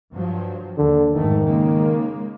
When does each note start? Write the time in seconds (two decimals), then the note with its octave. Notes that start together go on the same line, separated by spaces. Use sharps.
0.11 G2 F3 F#3
0.77 D#2 D3
1.15 F1 G#2 D#3 A3
1.44 C#3 G#3 A#3